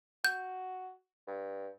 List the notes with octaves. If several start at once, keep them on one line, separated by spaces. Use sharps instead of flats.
F#4 G6
G2